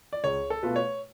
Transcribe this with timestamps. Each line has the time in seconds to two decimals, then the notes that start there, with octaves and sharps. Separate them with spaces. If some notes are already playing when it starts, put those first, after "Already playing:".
0.13 D5
0.24 C#2 C#5
0.50 A4
0.63 B2 A3 F4 B4
0.76 C#5